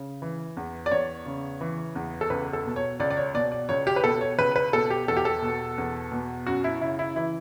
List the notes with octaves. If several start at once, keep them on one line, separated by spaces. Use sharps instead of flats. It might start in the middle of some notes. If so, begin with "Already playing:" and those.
Already playing: C#3
E3
E2
D5
E2 C#5
C#3
E3
E2
A4
C#2 B4
A4
B2
C#5
C#2 D5
D5
C#5
B2 D5
D5
C#2 C#5
G4
B4
B2 A4
C#5
C#2 B4
B4
B2 A4
G4
E2 A4
G4
A4
B2
E2
B2
F#2 F#4
E4
C#3 E4
E4
E3 E4